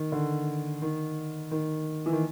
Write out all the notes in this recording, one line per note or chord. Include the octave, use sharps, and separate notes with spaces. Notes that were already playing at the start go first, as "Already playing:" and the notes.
Already playing: D#3
D3
D#3
D#3
E3
D#3